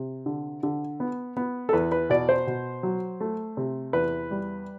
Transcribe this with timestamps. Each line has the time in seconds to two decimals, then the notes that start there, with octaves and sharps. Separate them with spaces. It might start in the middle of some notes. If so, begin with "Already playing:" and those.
Already playing: C3
0.26 D3
0.63 D3
1.00 B3
1.37 B3
1.69 A4
1.73 E2 B4
1.92 B4
2.10 B2 D5
2.29 C5
2.47 B2
2.83 F#3
3.21 A3
3.57 C3
3.93 E2 B4
4.31 G3